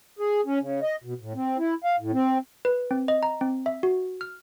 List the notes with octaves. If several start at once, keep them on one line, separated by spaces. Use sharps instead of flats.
G#4
C#4
C#3
D#5
B2
A2
C4
E4
F5
A2
C4
B4
C4
D#5
A#5
C4
E5
F#4
F6